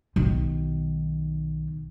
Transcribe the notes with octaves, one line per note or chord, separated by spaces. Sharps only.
B1 D#3